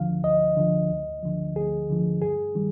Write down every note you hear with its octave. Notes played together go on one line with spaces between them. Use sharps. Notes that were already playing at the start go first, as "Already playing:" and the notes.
Already playing: D2 D3 F3 F5
D2 D#5
D3 F3
D2
D3 F3
D2 G#4
D3 F3
G2 G#4
D#3 G3